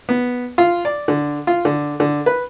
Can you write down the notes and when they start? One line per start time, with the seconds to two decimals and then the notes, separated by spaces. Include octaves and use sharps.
0.09 B3
0.58 F4
0.85 D5
1.08 D3
1.47 F4
1.65 D3
2.00 D3
2.26 B4